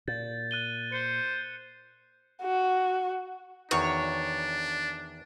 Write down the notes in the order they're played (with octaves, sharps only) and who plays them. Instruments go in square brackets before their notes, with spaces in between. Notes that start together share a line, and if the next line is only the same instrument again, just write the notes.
[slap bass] A#2 [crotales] G6 A6
[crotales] F#6 D#7 G7
[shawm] C5 [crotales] C#7
[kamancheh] F#4
[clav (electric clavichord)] E2 D#3 F#4 [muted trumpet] D4 [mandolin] C#5